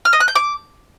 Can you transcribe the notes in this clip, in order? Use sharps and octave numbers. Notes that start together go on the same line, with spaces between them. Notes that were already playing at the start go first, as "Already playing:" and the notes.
F6
D#5
F#6
G6
D6